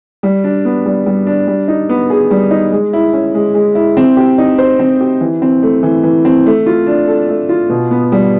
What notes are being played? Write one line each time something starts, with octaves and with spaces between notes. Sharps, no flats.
G3
D4
B3
G3
G3
D4
G3
D#4
B3
G#4
G3
D#4
G#3
E4
C#4
G#3
G#3
E4
C4
G4
D#4
C5
C4
G4
E3
C4
A3
E3
E3
C4
A3
F4
D4
A4
A3
F4
B2
B3
G3